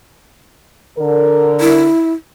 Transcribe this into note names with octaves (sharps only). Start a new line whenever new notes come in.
D3 A#4
E4